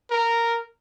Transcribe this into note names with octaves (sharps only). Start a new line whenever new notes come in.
A#4